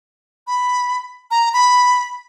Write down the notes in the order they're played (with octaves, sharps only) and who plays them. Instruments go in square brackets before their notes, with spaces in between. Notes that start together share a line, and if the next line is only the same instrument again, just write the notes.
[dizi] B5
A#5
B5